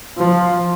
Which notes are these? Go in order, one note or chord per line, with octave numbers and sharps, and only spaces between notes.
F3